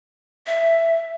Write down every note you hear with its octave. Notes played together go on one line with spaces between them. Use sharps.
E5